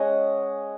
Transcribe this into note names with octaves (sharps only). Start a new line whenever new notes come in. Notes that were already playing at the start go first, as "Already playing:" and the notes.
Already playing: G#3 C#4 D#5 F#5 G#5